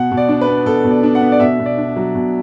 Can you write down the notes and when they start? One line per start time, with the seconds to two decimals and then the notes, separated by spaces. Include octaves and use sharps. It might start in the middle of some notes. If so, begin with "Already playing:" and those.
Already playing: B2 F#5
0.11 B2
0.17 D5
0.29 D4
0.41 B4
0.48 B3
0.66 B2 A4
0.84 B2
0.90 D5
1.03 D4
1.15 F#5
1.22 B3
1.32 D5
1.40 B2 E5
1.59 B2
1.66 D5
1.78 D4
1.96 F#3
2.15 B2